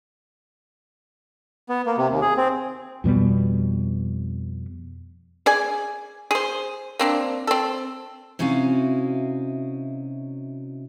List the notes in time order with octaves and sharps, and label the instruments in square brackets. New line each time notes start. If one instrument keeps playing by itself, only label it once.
[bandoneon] B3
A#3
C3
D#2
G#4
C4
[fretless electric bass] F2 B2 G3 B3
[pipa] G#4 D5 G#5
G#4 C5
A#3 C4 D4
C4 A4
[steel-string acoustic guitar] C3 C#4 D#4 E4 F#4 F5